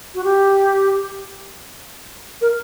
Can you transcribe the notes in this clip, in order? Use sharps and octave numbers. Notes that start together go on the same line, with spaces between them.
F#4
G4
A#4